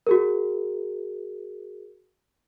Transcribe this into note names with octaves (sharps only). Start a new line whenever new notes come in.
F#4 G#4 A#4